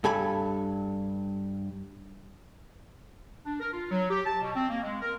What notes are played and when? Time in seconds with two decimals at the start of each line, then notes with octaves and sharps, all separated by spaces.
0.04 G2 A4 G#5 B5
3.45 D4
3.60 A#4
3.73 F4
3.91 F#3
4.10 G4
4.26 A5
4.42 B2
4.56 C4
4.69 A#3
4.84 G#3
5.02 A#4